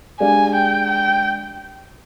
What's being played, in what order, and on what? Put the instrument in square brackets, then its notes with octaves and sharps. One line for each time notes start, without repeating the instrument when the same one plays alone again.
[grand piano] G#3 D4 G4 D5 F5 [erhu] G#5
[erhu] G5
G5